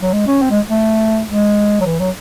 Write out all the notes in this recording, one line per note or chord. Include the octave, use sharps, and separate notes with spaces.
F#3
G#3
C#4
C4
G#3
A3
G#3
F#3
E3
F#3